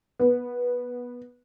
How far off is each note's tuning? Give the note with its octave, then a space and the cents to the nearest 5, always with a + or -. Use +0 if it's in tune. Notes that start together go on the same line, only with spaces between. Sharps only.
B3 -15